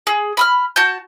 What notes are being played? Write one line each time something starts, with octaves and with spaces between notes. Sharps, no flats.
G#4
B5 D#6 F6
F#4 A5 G6